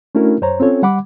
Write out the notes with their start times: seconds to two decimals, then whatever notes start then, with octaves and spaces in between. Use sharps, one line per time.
0.15 A3 C#4 D4 E4 F#4 A#4
0.42 F#2 C5 C#5 A#5
0.60 C4 C#4 F4 A4 C#5
0.83 G3 F#5 B5 D6